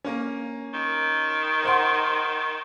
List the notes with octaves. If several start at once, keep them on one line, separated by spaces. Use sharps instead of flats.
A#3 C#4
D#3
C5 F#5 C6